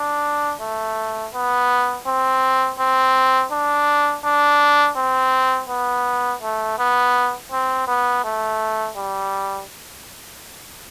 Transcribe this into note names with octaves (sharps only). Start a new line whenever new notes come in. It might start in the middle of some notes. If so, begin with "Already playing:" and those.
Already playing: D4
A3
B3
C4
C4
D4
D4
C4
B3
A3
B3
C4
B3
A3
G3